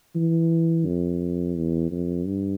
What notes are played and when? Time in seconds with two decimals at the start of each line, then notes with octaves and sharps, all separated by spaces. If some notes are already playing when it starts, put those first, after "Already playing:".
0.15 E3
0.86 F2
1.57 E2
1.91 F2
2.26 G2